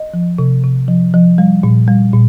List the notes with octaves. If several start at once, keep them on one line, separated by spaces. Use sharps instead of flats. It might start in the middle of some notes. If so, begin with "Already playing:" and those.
Already playing: D#5
F3
C3
C3
F3
F3
G3
A#2
G3
A#2